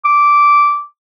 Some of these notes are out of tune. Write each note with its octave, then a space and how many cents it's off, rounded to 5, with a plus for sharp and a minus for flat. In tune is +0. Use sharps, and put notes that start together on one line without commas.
D6 -10